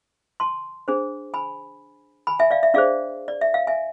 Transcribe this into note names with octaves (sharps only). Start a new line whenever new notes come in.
A5 C6
D4 G#4 C5
G#5 B5
G#5 B5
E5 G#5
D5 F5
E5
D4 G#4 C5 D5 F5
D5
E5
F5
E5 G#5